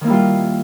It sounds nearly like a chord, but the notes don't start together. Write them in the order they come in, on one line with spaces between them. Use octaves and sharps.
D#3 A#3 E4 G3 F4